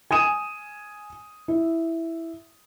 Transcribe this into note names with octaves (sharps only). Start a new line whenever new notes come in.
G#5 D#6 D#7 E7
E4